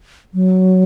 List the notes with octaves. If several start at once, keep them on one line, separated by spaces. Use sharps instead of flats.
F#3